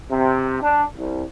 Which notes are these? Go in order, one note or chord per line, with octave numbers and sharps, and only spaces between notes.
C3
D4
C2